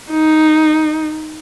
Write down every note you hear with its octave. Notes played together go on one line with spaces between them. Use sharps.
D#4